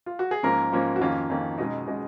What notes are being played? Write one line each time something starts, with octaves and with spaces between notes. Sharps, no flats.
F4
F#4
G#4
G#2 F3 A#3 C#4 A#4
G#2 F3 A#3 C#4
F#4
F2 D#3 A#3 C#4 F4
F2 D#3 A#3 C#4
B2 G#3 C#4 D#4
B2 G#3 C#4